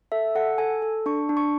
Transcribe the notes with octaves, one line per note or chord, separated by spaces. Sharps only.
A4 E5
A4 F#5
A4 G#5
A4
D4 C#6
D4
C#6